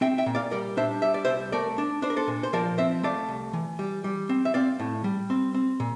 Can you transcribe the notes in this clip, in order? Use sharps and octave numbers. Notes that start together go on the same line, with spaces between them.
C4 E5 G5
E5 G5
A#2
D5 F5
G3 A#4 D5
D4 C5 E5
G3 E5
D5
C2 C5 E5
A3 A#4 D5
D4
D4 C5
A#4
A4 C5
A#2
C5
F3 A#4 D5
C4 C5 E5
A3 D5 F5
C2
E3
G3
G3
C4
E5
C4 D5 F5
A2
G3
C4
C4
A#2